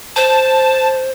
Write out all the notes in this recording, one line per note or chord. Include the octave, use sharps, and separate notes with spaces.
C5 A5